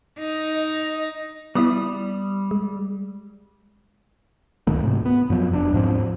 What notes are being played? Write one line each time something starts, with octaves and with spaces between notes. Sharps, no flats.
D#4
D#5
G3 B3 E4 D#6
G#3
C#2 A#2 D#3 A3
G#2 C3
B3
F#2 F3 F#3
F1 C3 D4
D#2 G#2 F3 C4